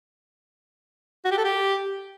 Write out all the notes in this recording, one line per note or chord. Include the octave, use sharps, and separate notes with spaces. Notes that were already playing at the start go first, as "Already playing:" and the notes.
F#4
G4
A4
G4